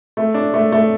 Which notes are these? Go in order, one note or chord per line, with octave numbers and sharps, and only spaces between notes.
A3
D4
A3
A3